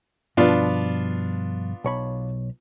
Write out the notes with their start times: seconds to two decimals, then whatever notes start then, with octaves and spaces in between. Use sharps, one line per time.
0.37 G2 B2 F3 B3 D4 F4
1.84 B1 C#5 B5